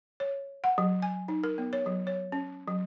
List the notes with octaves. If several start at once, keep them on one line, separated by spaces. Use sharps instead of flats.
C#5
F#5
F#3
G#5
D#4
A#4
B3
C#5
F#3
C#5
C#4
F#3